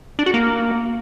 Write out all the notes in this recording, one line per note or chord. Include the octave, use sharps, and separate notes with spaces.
D4
F#4
A#3